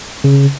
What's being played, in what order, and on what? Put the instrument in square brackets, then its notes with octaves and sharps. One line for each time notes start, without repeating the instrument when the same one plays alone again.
[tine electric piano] C#3